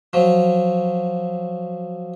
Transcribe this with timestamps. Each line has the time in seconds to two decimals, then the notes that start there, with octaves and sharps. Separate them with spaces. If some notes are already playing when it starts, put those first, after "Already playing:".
0.13 F3 F#3